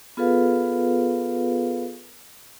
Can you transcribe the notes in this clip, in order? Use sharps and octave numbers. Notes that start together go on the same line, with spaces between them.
B3 F4 G#4 A4 B4 F5